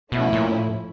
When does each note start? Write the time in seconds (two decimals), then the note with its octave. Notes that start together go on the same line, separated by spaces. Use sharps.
0.12 B2 F3 A3 C#4 E4
0.33 A#2
0.51 A2